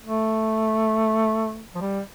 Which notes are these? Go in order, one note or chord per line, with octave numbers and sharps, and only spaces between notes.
A3
F3
G3